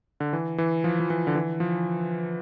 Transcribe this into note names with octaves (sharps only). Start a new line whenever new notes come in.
D3
E3
E3
F3
F3
E3
D3
E3
F3